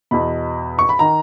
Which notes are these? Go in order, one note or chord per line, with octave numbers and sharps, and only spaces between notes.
E2 B2 B5
C#6
B5
D#3 A#5